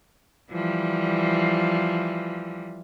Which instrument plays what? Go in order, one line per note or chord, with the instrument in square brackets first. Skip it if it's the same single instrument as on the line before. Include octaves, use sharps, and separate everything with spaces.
[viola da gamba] E3 F3 G3